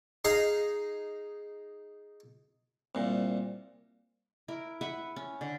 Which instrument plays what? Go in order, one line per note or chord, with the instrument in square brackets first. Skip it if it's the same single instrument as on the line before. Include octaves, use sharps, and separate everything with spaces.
[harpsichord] D#4 G#4 D#5 F5 A#5
C2 A#2
[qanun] E4 A#4
B4 E5 F#5
C#4
D3